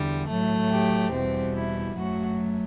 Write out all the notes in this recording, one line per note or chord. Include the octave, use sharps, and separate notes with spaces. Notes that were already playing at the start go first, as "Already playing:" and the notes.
Already playing: E2 D3 G3
A2 F#3 A3
G4
E2 B2 G3 C4
E4
F#2 F#3 A3 F#4